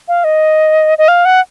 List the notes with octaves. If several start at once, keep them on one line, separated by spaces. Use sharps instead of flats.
F5
D#5
D#5
F5
F#5